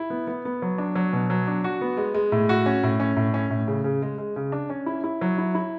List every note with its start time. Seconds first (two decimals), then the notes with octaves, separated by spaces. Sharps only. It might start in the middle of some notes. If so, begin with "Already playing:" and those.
Already playing: E4
0.10 B3
0.27 B3
0.45 B3
0.62 F#3
0.78 D4
0.95 F#3
1.13 B2
1.30 F#3
1.47 D4
1.64 F#4
1.81 B3
1.97 G#3
2.14 G#3
2.32 A2
2.49 F#4
2.66 C#4
2.83 A2
3.00 C#4
3.16 A2
3.34 C#4
3.50 A2
3.68 C#3
3.84 C#3
4.02 G#3
4.18 G#3
4.36 C#3
4.52 D4
4.70 C#4
4.86 E4
5.04 E4
5.21 F#3
5.38 E4
5.55 E4